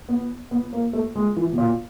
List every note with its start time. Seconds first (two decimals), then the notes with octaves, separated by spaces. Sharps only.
0.09 B3
0.51 B3
0.73 A#3
0.93 A3
1.16 G#3
1.36 E3
1.53 B2
1.58 A#2